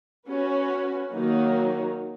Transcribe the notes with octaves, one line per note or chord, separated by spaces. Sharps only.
C#4 F#4 B4
D#3 F#3 A#3 D#4 F#4